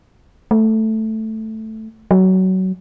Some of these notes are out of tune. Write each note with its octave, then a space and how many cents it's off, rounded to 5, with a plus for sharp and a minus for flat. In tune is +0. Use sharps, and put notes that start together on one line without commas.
A3 +0
F#3 +20